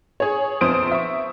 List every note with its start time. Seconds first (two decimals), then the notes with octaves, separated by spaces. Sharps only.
0.20 G#4 C#5
0.61 A#1 F2 B3 C5 D#6 D7
0.91 E5 C#6